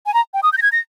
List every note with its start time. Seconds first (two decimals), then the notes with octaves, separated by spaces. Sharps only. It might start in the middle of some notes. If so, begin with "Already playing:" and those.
0.06 G#5
0.14 A#5
0.34 G5
0.43 D#6
0.53 G6
0.58 A#6
0.62 G#6
0.72 A#6